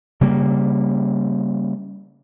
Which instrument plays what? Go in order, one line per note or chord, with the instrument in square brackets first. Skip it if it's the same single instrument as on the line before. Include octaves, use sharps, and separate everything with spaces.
[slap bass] C#3 G3 A#3